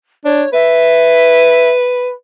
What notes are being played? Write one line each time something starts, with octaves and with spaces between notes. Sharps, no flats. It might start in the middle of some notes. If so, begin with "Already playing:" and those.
D4 C#5
B4 E5